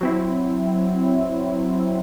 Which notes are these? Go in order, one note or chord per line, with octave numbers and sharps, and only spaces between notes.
F#3 C4 E4